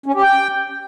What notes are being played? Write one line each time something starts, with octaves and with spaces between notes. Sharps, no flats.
C#4
G4
G5